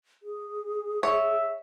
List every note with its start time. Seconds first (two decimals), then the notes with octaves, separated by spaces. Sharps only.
0.23 G#4
1.03 C#5 E5